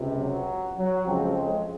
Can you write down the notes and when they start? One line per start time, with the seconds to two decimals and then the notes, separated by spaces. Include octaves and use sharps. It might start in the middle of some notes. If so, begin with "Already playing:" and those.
Already playing: C#2 C3
0.19 F#3
0.77 F#3
1.06 F2 C#3 F3 G#3 C4
1.35 G#3